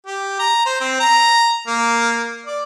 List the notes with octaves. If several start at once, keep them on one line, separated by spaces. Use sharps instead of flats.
G4
A#5
C5
C4
A#5
A#3
D5